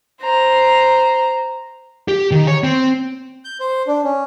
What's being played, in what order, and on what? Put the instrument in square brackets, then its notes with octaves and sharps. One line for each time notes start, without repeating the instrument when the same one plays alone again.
[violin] C5 A#5
[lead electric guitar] G4
D#3
C#5
C4
[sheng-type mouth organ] G6
C5
D4
C#4